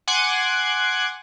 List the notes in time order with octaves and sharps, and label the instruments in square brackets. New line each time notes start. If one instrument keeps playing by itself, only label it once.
[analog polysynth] F#5 G#5 C6 D6 F#6 G#6